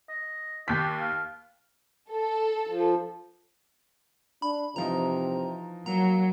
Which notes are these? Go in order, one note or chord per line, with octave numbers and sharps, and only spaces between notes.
D#5
D#2 G4 B6
F5
A4
F3
D4 B5
C3 E3 F3 D#4 A#5
F#3 A#3 A#5